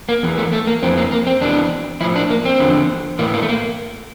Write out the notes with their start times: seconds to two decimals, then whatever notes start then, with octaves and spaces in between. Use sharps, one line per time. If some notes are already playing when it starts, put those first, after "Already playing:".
0.09 A#3
0.23 E2 E3
0.38 A3
0.53 A3
0.67 A#3
0.82 F2 E3 C4
0.97 A#3
1.12 A#3
1.27 C4
1.41 E2 E3 D4
2.01 A2 F3 E4
2.16 D4
2.30 A#3
2.45 C4
2.60 E2 D3 F3
3.19 A2 E3 A#3
3.34 A#3
3.42 A3
3.49 A#3